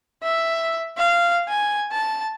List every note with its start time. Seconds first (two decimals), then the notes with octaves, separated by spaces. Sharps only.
0.23 E5
0.98 F5
1.49 G#5
1.92 A5